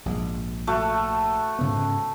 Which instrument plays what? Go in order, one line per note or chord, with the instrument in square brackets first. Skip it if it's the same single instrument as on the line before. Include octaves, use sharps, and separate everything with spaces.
[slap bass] A#1 G#2
[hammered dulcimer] A3 F#4
[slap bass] G#2 C#3 B3